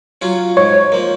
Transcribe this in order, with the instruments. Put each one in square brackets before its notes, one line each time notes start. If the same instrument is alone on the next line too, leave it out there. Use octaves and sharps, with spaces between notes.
[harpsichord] F#3 C#4 F4
[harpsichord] G#2 [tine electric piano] C#5
[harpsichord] F3 A#3